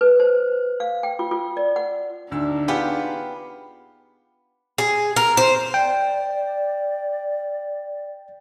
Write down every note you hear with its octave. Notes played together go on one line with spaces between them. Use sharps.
B4
C5
F5
G5
F4
F4
D5
F#5
D2 D4 D#4 E6
B3 F4 G4 G#4
G#4
A#4
C5
D5 G5